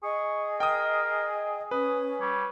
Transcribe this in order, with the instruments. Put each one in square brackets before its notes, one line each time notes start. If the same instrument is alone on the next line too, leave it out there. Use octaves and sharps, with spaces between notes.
[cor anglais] G#4 [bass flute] D#5 [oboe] C#6
[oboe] A#4 [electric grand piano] G5 D#6
[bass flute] C#4 [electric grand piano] B4 [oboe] D#6
[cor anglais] G3 [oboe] C#5